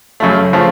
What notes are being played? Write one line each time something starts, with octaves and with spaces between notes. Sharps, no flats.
F#2 C#3 A3
C#3 F3 A3